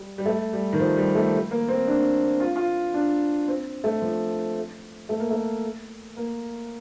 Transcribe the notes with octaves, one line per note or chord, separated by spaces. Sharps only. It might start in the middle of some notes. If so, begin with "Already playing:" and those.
Already playing: G3
G3
A3
G3
D#3
F3
G3
A3
A#3
C4
D4
F4
F4
D4
C4
A3
F3
A3
A#3
A3
A#3